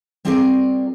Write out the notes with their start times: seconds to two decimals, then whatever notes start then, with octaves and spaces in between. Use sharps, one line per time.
0.25 G3 C4 F4 G#4 A#4 D5